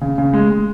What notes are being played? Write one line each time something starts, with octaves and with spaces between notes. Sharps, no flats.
C#3
C#3
G#3
G#3